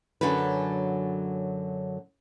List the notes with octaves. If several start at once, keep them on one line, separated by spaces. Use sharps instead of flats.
F#2 A#2 D3 F#3 C#4 B4